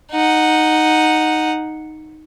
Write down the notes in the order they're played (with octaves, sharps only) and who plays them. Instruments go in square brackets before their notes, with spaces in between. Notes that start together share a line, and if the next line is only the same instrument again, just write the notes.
[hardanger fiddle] D#4 F#5